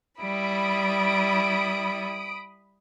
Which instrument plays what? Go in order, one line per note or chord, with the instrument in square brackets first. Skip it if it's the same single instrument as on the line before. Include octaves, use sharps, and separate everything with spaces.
[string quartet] G3 E4 [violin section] B5 D#6 D7